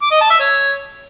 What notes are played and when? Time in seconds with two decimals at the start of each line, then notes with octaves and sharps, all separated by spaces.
0.02 D6
0.11 D#5
0.21 A5
0.30 E5
0.40 C#5